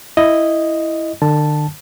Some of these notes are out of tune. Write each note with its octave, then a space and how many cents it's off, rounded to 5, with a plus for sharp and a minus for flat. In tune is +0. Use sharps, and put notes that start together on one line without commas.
E4 +0 D#5 +0
D3 +40 A5 +0